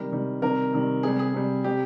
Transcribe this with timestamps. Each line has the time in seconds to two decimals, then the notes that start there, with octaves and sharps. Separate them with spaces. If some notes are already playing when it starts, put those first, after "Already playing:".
Already playing: C3 D#3 G3 A#4
0.12 C3 D#3 G3
0.42 C3 D#3 G3 A#4
0.73 C3 D#3 G3
1.03 C3 G3 G#4
1.19 G#4
1.34 C3 G3
1.64 C3 G3 G4